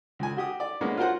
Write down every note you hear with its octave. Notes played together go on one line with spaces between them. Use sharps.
C#2 G#5
F#4 G4 D#6
D5
G#3 A#3 B3 C#4 D4
F4 F#4 A#4 C5 F#5